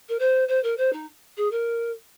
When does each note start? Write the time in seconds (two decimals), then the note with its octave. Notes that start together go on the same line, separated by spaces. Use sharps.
0.08 A#4
0.19 C5
0.48 C5
0.63 A#4
0.77 C5
0.92 D#4
1.37 G#4
1.51 A#4